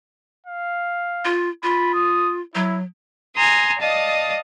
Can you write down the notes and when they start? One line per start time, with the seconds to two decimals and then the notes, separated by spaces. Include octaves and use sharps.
0.46 F5
1.25 F4
1.63 F4 B5
1.94 D#6
2.55 F#3 E4
3.35 G#5 A#5 C6 D#6
3.79 D5 D#5 F5 A5 D#6